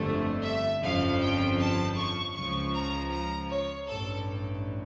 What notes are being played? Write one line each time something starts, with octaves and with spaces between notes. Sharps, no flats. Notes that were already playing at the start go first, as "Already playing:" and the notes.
Already playing: G1 F2 D3 A3
E5
G1 F2 C#3 F3 F5
G5
A5
C#6
C#2 C#3 F3 C#6
A#5
A#5
C#5
A1 G2 A4